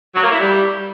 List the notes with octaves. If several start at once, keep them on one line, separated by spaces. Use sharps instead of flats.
F#3
A#3
E4
G3